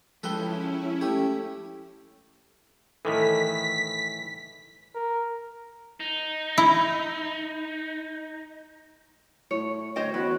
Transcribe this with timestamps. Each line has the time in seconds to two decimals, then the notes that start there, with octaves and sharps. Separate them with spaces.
0.23 F3 G#3 C#4 E4 A4 B4 G5
1.01 A3 G4
3.05 A2 D#3 E3 A4 B6
4.95 A#4
6.00 D#4
6.58 E4
9.51 A2 C#5
9.96 D2 C5 C#5 D#5 G5
10.14 E2 F#4 B4